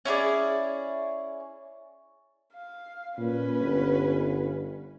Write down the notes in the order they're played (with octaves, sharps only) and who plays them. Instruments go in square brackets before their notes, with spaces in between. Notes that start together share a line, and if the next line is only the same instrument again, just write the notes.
[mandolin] C#4 E4 G#4 D5
[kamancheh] F5
[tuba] A#2 [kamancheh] C#4 B4
[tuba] G1